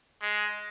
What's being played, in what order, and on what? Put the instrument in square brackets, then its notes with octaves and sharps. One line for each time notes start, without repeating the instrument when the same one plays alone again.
[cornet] G#3